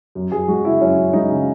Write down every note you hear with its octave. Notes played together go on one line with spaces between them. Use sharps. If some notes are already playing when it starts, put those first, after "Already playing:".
F#2
F#2 G#4
G#3 F#4
C#3 E4
F#2 C#4
F#2
G#3 D#4
C#3